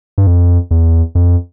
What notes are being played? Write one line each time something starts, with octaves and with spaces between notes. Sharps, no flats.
G2
F2
E2
F2